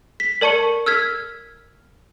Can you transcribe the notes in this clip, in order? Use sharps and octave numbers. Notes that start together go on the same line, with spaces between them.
B6
A#4 D5 A5 C#6 C#7
E6 F6 G#6 B6